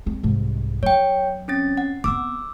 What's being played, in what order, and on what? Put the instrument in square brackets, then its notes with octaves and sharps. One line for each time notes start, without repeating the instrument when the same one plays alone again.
[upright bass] G#3 C4
C2 G#2
[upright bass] F#3 [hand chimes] C#5 G5
[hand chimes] C4 C#4 A6
F#5
[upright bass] B3 C4 [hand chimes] D6 E6